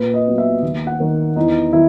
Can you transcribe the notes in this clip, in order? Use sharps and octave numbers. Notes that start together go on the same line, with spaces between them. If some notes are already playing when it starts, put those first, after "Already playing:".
Already playing: A#2 B4
D#5
F#3 B3
E5
D#2
F#5
D#3 A#3
E2 D#4
D#3 E4